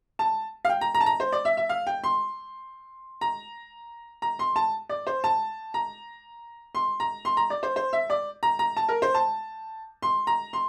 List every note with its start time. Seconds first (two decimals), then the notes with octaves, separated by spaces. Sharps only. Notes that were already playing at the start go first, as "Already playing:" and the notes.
0.19 A5
0.65 F5
0.69 G5
0.81 A#5
0.94 A#5
1.01 A5
1.06 A#5
1.20 C5
1.32 D5
1.45 E5
1.57 E5
1.69 F5
1.87 G5
2.04 C6
3.21 A#5
4.22 A#5
4.39 C6
4.56 A5
4.89 D5
5.07 C5
5.24 A5
5.74 A#5
6.75 C6
7.00 A#5
7.25 C6
7.37 A#5
7.50 D5
7.63 C5
7.76 C5
7.93 E5
8.10 D5
8.43 A#5
8.59 A#5
8.77 A5
8.89 A#4
9.02 C5
9.15 A5
10.02 C6
10.27 A#5
10.53 C6